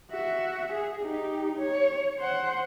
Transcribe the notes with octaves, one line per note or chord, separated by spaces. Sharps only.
F#4 E5
G#4
D#4 G4
C#5
C5 F#5